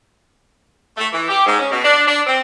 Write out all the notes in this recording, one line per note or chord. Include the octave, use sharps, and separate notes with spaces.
A3
E3
G4
G#2
C#4
B2
D4
D4
C4